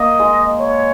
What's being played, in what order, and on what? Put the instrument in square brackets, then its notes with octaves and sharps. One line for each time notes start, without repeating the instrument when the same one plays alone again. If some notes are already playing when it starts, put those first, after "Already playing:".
Already playing: [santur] A#3 [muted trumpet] D#5
[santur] G#3
[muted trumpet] C#5